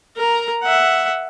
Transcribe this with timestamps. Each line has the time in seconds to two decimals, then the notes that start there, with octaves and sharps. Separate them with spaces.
0.17 A#4 A#5
0.63 E5 F#5